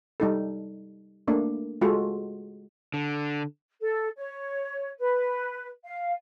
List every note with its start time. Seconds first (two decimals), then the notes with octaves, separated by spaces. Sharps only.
0.20 G3 D#4 A4
1.28 A3 A#3 D4
1.81 G#3 F4 F#4 A4
2.94 D3
3.81 A4
4.17 C#5
4.99 B4
5.85 F5